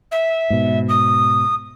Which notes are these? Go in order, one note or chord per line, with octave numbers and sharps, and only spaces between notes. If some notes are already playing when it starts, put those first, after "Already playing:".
E5
G#2 B2
D#6